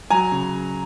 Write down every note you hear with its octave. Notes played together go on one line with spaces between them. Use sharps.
F#3 G#5 A#5
C#3